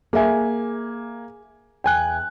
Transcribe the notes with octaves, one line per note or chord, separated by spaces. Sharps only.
A#3 G#4 E5 G#5
E2 G5 G#5 F#6